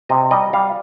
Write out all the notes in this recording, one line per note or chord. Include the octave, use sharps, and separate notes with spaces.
C3 D#5
G3 D#5
G3 F5